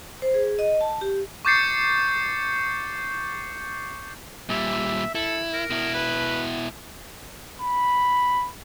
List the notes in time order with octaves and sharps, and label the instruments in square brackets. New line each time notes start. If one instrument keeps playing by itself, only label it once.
[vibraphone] C5
G#4
D#5
A5
G4
[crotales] C#6 D6 G6 A6 C7 C#7
[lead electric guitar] A#2 G3 [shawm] E5
[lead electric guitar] E4 [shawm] A4
[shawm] A#4
[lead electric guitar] B2 E4
[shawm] B4
[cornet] B5